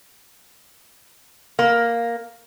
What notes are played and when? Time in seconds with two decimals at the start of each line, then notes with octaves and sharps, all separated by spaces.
1.59 A#3